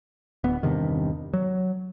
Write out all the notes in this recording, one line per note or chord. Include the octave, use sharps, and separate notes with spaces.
D1 B3
E2 G2 C3 D#3
F#3